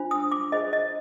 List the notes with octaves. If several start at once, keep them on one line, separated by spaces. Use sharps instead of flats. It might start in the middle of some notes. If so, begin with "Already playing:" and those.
Already playing: D4 F4 C5
D#6
D6
F4 G#4 C5 D#5
D#5